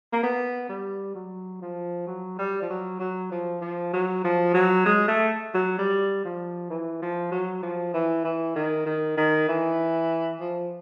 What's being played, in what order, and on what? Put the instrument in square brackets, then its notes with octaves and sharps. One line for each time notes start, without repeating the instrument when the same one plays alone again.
[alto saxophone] A#3
B3
G3
F#3
F3
F#3
G3
F3
F#3
F#3
F3
F3
F#3
F3
F#3
G#3
A3
F#3
G3
F3
E3
F3
F#3
F3
E3
E3
D#3
D#3
D#3
E3
F3